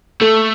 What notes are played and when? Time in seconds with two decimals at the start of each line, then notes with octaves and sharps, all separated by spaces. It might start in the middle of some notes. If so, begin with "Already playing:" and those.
0.21 A3 A4